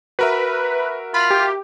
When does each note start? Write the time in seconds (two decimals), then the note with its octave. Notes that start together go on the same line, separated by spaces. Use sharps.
0.19 F#4 A#4 B4 E5
1.14 F4 B5
1.30 G4